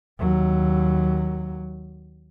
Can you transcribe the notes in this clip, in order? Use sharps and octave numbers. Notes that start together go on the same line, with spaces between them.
D#2 F#3